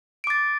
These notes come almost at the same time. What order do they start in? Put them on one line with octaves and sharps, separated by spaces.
D7 D6 A6